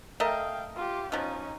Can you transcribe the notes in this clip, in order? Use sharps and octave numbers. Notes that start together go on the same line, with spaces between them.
A3 A#4 D#5 F5 G5
F4 G4
B2 F3 C#4 D#4